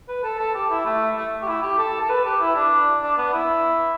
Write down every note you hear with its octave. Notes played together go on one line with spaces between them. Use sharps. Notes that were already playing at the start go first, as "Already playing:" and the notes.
B4
A4
A4
G4
E4
A3
A3
G4
E4
G4
A4
A4
B4
G4
E4
D4
D4
B3
E4